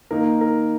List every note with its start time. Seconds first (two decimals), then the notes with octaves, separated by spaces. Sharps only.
0.11 D#3 A#3 D#4 A#4
0.41 A#4